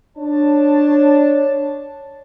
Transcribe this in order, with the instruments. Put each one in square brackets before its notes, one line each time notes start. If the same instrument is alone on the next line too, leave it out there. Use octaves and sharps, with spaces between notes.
[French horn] D4 [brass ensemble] C#5 A5